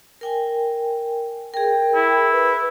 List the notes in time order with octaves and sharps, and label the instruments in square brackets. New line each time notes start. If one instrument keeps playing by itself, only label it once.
[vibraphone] A#4 G5 G#5
[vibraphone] G#4 A#4 [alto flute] G5
[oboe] E4
[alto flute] B4